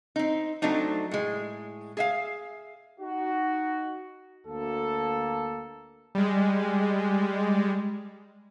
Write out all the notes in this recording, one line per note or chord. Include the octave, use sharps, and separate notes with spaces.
C4 D#4
F#3 A3 C4 D4 D#4
A2 G#3
G#4 E5 F5
D#4 F#4
D2 A#3 A4
G3 G#3